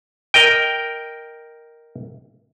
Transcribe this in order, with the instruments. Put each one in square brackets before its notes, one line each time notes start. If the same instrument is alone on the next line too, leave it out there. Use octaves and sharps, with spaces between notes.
[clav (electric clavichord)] A#4 D#5 G5